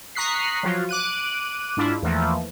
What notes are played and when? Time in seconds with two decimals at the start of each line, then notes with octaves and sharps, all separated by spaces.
0.15 A#5 C#6 D#6 F#6 B6 C7
0.63 F3 F#3 F4 F#4
0.89 D6 F#6 D#7
1.77 G#2 D4 E4 F4
2.02 E2 E3 F3 A3 A#3